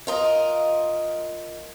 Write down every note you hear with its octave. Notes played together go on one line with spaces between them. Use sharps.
F4 A#4 D#5